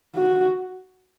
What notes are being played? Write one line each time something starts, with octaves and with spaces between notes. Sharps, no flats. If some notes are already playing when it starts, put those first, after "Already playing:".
F#4